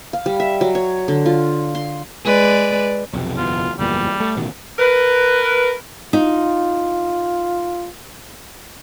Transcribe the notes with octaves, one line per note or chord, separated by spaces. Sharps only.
F5
G3
E5
F#3
C#5
D3
F4
C6
G#3 B4 D5
B1 F2 C3
F#1 E2 B2 F4
F#1 E2 A#2 G3
A3
A1 B2 D#3
A#4 B4
D#4 F4